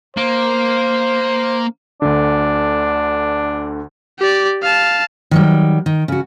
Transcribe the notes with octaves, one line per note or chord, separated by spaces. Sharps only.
A#3 C5
D2 D3 D4
G4 D5
F5 A5
D#3 F#3 G3
D#3
C#3 F#4